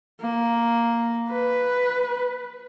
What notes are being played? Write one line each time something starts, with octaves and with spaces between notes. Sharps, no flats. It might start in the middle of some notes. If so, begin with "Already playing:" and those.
A#3
B4